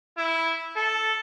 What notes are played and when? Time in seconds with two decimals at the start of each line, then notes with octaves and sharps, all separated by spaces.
0.17 E4
0.76 A4